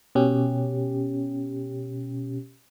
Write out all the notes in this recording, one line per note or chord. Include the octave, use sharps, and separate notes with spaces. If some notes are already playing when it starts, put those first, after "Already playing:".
B2 C#4 G4